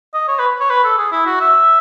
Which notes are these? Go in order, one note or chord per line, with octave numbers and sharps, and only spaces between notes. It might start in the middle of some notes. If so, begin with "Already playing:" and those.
D#5
C#5
B4
C#5
B4
A4
G#4
E4
F#4
E5